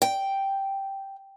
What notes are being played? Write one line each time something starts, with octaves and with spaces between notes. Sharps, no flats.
G5